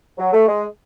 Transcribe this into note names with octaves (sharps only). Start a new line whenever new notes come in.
F#3
A3
G#3